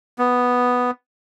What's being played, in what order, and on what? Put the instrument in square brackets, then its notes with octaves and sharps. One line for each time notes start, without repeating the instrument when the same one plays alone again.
[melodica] B3